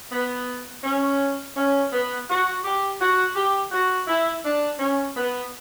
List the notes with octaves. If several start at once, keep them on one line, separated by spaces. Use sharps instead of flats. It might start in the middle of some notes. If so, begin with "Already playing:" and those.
B3
C#4
C#4
B3
F#4
G4
F#4
G4
F#4
E4
D4
C#4
B3